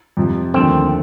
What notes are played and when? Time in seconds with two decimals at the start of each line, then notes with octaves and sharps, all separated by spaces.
0.17 F2 C3 F3
0.54 D#2 D3 F3 A3 C4